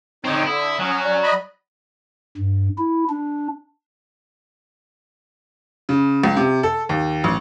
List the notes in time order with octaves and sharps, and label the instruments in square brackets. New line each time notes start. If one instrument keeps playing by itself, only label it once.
[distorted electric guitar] D3 C4 [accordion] D#4 C#5
[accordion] D3 [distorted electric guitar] E4 [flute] D#6
[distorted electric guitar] F#3 [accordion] C#4
[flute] D5
[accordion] D#5 B5
[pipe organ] G2
E4
D4
[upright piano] C#3
C#2
C3
A4
D#2
A1